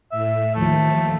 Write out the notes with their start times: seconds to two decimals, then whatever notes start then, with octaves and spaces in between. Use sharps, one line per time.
0.12 A2 E5
0.55 D#2 F3 A3